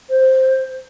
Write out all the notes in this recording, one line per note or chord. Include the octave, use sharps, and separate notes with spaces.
C5